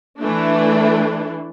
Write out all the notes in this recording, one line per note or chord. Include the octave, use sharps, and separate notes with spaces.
E3 A3 D4